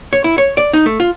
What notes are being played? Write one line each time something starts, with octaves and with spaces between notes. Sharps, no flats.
C#5
E4
C#5
D5
D#4
A3
F4